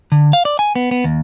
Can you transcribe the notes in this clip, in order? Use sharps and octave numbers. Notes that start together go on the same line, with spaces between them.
D3
F5
D5
G#5
B3
B3
D#2